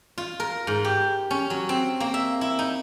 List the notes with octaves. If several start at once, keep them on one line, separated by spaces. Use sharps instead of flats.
F4
A#4
G#2
G4
C#4
F#3
C4
A#3
E5
E4
D#4